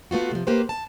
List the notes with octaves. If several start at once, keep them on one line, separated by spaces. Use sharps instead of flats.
A3 B3 F4 F#4
C3 F3
A#3 G4 B4 C5
A5